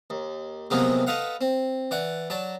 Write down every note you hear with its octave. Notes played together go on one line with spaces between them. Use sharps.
D#2
C3 F3 F#3 G#3 A#3 B3
A4 B4 D#5 F5 F#5
C4
E3 D5 F#5
F#3 D5 A5